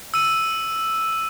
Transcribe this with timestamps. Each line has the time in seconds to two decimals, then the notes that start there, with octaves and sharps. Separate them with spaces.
0.14 E6 D#7